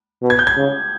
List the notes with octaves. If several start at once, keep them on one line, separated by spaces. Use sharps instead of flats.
B2
G#6
G6
G#6
C#3